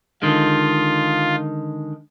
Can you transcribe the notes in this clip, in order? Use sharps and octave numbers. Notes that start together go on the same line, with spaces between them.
D3 D#3 G#3 F4